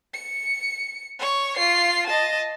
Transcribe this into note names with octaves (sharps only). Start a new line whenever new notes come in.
C#7
C#5 C#6
F4 C7
D#5 A5